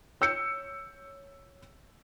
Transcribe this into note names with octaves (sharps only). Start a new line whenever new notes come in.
C#5 E6 G6 C#7